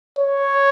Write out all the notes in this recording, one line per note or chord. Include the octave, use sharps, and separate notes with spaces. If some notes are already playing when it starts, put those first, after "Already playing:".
C#5